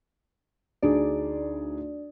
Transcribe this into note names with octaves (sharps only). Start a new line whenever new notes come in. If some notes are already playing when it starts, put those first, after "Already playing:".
D2 D4 D#4 G#4 D5